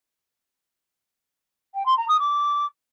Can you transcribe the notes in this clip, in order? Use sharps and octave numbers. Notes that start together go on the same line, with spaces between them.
G5
C6
A#5
D#6
D6